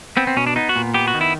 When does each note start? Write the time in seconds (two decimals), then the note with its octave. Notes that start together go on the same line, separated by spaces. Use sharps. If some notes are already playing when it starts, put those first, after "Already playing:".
0.17 B3 C4
0.27 C4
0.37 B2 C#4
0.47 D4
0.56 B3 D#4
0.69 F#4
0.76 A#2
0.94 B3 G4
1.08 F#4
1.14 D#3
1.21 E4